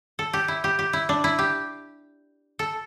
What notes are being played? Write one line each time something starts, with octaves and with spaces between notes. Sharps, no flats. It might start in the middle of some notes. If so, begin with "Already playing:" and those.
A4
G4
E4
G4
G4
E4
D4
E4
G4
A4